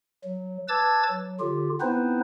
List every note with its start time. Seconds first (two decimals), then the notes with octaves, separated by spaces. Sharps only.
0.24 F#3
0.68 B4 A5 D6 E6 G#6 A6
1.09 F#3
1.40 D3 F4 G4
1.81 B3 C4 D#4 E4 B4 C5